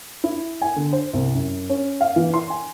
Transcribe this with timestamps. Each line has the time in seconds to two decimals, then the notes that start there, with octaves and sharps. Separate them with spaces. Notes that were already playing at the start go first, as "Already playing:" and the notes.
0.24 E4
0.62 G#5
0.76 D3
0.93 C5
1.13 C2
1.34 F#2
1.69 C#4
2.01 F5
2.16 E3
2.34 C6
2.50 G#5